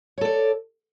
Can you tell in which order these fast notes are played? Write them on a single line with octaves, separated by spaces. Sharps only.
C#5 A4 D5